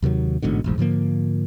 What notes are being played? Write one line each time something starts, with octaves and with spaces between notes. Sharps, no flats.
D#2 C3 D#3 F#3
A1 G#2 B2 D3
E1 A1 G#2
G#2 D3 F3 A#3